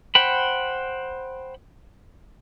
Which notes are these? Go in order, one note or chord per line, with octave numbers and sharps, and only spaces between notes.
C5 F#5 G5 B5